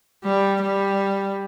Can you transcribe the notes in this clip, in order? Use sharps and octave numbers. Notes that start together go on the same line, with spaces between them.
G3
G3